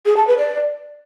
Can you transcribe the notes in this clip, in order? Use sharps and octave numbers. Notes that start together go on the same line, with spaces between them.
G#4
A5
B4
D5